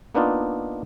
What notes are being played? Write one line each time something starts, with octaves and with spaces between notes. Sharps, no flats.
A#3 B3 D4 D#4 F4